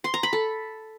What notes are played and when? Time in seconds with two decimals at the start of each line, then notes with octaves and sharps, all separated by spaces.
0.04 C6
0.14 A#5
0.23 B5
0.33 A4